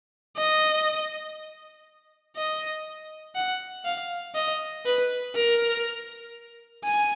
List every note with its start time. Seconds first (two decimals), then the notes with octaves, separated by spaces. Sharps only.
0.37 D#5
2.36 D#5
3.35 F#5
3.85 F5
4.35 D#5
4.85 B4
5.35 A#4
6.84 G#5